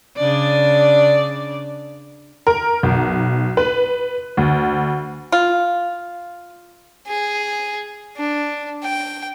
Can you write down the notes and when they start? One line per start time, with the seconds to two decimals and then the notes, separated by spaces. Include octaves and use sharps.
0.17 C#3 D4 D5
2.47 A#4
2.83 B1
3.57 B4
4.37 D2
5.32 F4
7.07 G#4
8.16 D4
8.83 G5